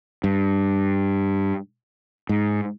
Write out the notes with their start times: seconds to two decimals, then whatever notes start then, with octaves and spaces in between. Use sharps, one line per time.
0.24 G2
2.29 G#2